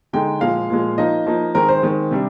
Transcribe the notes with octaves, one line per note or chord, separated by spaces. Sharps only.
D3 G#3 D#4 G5
A#2 F3 G#3 F5
A#2 F3 G#3
F3 A#3 D#4 D#5
F3 A#3 D#4
D#3 G#3 C4 A#4
C5
D#3 G#3 C4
C3 G3 D4